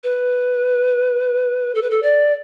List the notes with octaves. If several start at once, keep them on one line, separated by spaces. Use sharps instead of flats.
B4
A4
B4
A4
D5